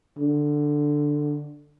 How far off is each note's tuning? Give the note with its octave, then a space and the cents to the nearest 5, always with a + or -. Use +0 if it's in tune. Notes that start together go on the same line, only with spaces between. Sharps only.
D3 +5